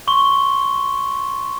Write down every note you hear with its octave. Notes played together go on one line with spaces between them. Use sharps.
C6 C#6 G7